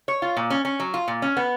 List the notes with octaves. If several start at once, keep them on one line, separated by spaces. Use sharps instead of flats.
C#5
F4
A#2
C#4
C#4
F#3
F4
A#2
C#4
B3